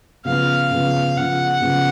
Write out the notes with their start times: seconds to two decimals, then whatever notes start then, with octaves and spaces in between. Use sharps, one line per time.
0.25 C#3 F3 B3 F5
0.71 C#3 F3 B3
1.16 C#3 F3 B3 F#5
1.61 C#3 F3 B3